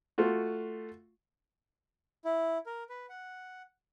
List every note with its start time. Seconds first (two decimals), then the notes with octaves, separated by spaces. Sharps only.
0.18 A3 F4 F#4
2.25 E4
2.66 A#4
2.89 B4
3.09 F#5